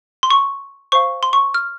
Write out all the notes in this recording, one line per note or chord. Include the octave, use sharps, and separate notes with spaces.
C6
C#6
C5 F5 C#6
C6
C#6
F6